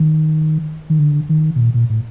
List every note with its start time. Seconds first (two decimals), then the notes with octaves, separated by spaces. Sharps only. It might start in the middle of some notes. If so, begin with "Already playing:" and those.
Already playing: D#3
0.90 D#3
0.99 D3
1.29 D#3
1.56 B2
1.59 A#2
1.74 A#2
1.90 A2